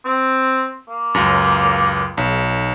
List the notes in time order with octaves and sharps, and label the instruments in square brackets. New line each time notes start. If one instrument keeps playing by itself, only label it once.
[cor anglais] C4
A#3
[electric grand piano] C#2 F#2
B1